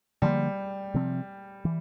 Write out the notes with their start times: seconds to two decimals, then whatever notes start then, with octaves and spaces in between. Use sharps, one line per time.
0.22 D3 F3 G3 A#3
0.94 C3 F3 C4
1.65 E3